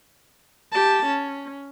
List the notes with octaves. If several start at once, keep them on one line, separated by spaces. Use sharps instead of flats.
G4 A5
C#4